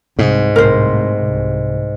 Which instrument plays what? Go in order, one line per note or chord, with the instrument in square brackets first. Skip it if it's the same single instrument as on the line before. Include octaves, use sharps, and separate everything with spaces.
[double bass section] C2 [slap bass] G#2
[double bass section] C2 A2 [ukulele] A#4 C5
[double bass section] C2